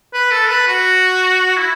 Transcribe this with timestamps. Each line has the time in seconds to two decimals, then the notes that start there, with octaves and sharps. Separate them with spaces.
0.13 B4
0.32 A4
0.49 B4
0.67 F#4
1.57 E4